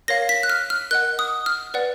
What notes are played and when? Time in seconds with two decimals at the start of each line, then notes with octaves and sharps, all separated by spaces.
0.08 A#4 C#5 F5 A#6
0.29 B6
0.43 F#6
0.50 F6
0.70 F6
0.91 A#4 D#5 F#5 F#6
1.19 D#6
1.46 F6
1.74 B4 D5 F#5